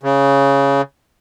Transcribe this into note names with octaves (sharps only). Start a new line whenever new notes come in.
C#3